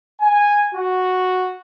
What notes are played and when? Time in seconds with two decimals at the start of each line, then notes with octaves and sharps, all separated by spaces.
0.19 G#5
0.72 F#4